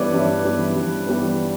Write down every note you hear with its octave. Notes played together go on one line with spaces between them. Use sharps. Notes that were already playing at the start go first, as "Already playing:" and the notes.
Already playing: G2 E3 G3 B3 B4 C#5 D5
G2 E5
E3 G3 B3
G2
E3 G3 B3